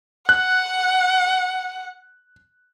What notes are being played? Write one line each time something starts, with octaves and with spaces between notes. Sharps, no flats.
F#5 F#6